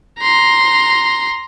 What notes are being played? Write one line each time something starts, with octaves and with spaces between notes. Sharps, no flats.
A#5 C6